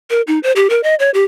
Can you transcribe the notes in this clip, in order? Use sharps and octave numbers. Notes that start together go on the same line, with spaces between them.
A#4
D#4
C5
G4
A#4
D#5
C#5
G4